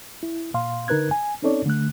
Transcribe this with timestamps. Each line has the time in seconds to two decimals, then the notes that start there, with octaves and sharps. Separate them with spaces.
0.23 E4
0.54 A#2 F5 C6
0.88 D3 D#4 A#4 B4 F#6 G#6
1.11 G#5
1.42 C4 C#4 D#4 A4 C#5 D5
1.66 D3 A3 F#6